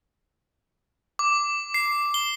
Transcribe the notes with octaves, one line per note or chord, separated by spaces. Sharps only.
D6
C7
G7